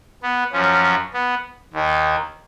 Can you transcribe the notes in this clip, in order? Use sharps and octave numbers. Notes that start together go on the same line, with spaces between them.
B3
F#2 F3 C#4
B3
D#2 D#3